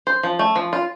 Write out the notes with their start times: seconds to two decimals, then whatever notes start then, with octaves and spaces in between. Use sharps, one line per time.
0.07 C5
0.23 F3
0.39 A3
0.56 F3
0.73 F4